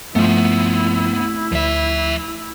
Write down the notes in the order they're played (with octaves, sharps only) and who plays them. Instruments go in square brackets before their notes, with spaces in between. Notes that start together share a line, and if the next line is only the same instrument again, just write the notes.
[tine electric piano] G2 F3 [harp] A3 [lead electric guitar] B3 C4 [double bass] E4
[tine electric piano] D2 [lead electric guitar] F3 E5